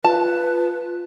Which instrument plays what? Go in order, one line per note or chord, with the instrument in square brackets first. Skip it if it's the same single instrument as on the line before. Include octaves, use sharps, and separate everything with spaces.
[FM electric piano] F4 [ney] B4 [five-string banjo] A5